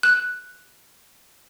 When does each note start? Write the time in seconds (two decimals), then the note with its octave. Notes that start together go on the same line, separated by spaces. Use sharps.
0.03 F#6